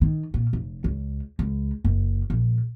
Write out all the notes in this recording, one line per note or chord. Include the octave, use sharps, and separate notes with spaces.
D#3
A#2
F1
C#2
C#2
F#1
A#1